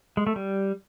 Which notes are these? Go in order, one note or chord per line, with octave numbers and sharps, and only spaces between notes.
G#3
A3
G3